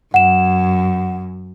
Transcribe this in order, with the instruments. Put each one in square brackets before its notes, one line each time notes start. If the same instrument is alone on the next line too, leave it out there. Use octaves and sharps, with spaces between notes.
[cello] F#2 [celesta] F#5 E7